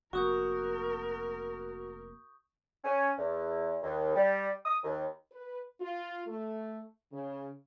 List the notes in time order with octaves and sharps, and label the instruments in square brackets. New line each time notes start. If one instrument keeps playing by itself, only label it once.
[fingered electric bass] F1 A#3 [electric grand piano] F#4 F#5 [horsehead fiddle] A#4 [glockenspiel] C#6 D#6 G6
[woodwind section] C#4
E2
D#2
G3
D#6
D#2
[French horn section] B4
F4
A3
C#3